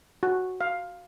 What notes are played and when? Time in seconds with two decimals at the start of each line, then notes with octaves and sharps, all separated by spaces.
0.23 F#4
0.61 F5